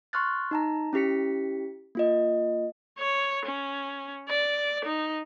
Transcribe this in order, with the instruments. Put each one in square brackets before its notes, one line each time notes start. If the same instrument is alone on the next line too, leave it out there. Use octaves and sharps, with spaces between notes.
[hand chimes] C6 C#6 F6 F#6 A6
D#4 A5 A#5
C#4 E4 G4 B6 C#7
A#3 F4 D#5
[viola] C#5
C#4
D5
D#4